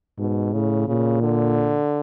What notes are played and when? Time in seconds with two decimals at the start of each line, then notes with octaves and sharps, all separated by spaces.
0.19 G#2 B2
0.53 A2 C#3
0.88 A#2 C#3
1.22 D3